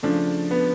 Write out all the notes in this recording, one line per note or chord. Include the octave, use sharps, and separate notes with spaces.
C#3 F3 A3 D4
B3